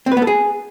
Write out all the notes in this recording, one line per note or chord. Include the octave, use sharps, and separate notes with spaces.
C4
B4
B3
A4
G#4